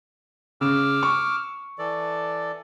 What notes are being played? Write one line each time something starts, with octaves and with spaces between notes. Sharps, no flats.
C#3 D6 E6 F6
C#6
E3 A4 D5